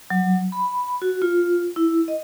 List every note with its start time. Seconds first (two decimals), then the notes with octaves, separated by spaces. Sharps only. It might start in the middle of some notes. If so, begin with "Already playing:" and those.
0.10 F#3
0.52 B5
1.02 F#4
1.22 F4
1.76 E4
2.08 D#5